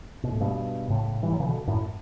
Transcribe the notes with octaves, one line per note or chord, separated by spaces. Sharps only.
B2
A2
G2 B2
A2 C#3
E3 G3
F#3
C#3 E3
B2 D3
F#2 A2